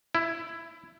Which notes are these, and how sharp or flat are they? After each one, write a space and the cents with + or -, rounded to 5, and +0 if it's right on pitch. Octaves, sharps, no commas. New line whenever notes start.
E4 +10